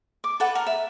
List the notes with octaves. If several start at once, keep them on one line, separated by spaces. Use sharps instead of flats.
D6
A4 B4 F#5
A#4
E5